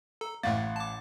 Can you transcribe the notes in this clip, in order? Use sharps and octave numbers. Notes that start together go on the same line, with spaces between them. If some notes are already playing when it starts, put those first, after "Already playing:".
A4 A#5
A1 A2 A3 A#3 F5 F#5 A6
A5 D6